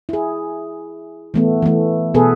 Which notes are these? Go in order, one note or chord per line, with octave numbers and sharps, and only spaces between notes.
E4 G#4
E3 A3 B3
E3 A3
B2 B3 G#4 A4 B4